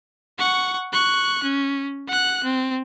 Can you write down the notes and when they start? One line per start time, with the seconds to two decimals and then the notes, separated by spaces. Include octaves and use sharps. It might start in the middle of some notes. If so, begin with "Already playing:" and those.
0.38 F#5 C#6
0.93 C#6 F#6
1.43 C#4
2.08 F#5 F#6
2.43 C4